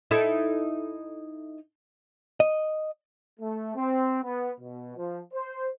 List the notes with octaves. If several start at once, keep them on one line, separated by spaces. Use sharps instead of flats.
D#4 E4 A4
D#5
A3
C4
B3
B2
F3
C5